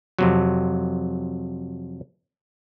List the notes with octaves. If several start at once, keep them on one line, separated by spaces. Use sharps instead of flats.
F2 C3 F#3